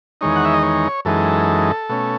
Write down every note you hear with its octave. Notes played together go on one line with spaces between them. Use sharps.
E2 D#3 G#3 D#4 C#5
F#5
E5
D#5
C#5
F#2 E3 G#3 D#4 A4
B2 A3 C#4